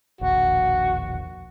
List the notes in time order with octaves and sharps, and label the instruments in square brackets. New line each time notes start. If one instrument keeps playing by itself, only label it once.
[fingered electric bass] E1 A#1 D#2 [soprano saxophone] F#4